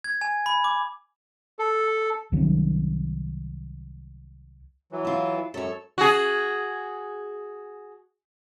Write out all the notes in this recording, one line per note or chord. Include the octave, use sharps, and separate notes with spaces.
G#6
G#5
B5
D6
A4
C2 D#3 F#3
E3 F#3
E4 F4
F#2 F#3 A4 C#5
F#4 G#4